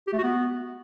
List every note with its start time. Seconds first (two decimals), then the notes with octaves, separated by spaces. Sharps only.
0.07 G4
0.12 A3
0.18 F#4
0.23 B3